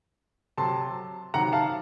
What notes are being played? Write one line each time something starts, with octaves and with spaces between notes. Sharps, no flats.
C3 F#3 A5 C6
C3 D#3 F#3 F#5 A#5
F5 A5